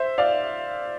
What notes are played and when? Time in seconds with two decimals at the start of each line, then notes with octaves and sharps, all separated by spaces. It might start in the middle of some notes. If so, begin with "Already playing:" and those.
Already playing: C5 E5
0.18 D5 F5